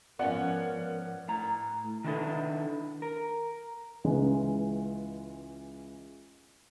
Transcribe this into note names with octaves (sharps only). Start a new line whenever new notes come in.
G#2 F3 B3 C#4 F4 A#4 D5 F#5
A2 A#5
D#3 D4 E4 F4 A4 B4
A#4
C#2 E3 G#3